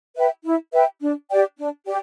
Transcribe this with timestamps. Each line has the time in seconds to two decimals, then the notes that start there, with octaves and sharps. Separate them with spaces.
0.15 B4 E5 G5
0.44 E4
0.72 B4 E5 G5
1.01 D4
1.30 G4 D5 G5
1.58 D4
1.86 G4 D5 G5